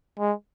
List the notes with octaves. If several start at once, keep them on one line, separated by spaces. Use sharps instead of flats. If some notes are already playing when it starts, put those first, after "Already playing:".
G#3